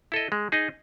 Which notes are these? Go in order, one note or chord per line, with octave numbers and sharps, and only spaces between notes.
E4 A4 D#5
G#3
D#4 G#4 D#5